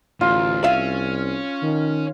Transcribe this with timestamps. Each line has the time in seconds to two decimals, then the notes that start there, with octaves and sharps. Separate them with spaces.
0.21 A1 D2 F4
0.64 C2 C#4 D5 E5 F5
1.63 D#3